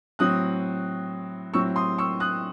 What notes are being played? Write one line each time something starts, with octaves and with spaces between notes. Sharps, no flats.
A2 F#3 C4 D#6 F#6
A2 F#3 C4 C#6 E6
C6 D#6
C#6 E6
D#6 F#6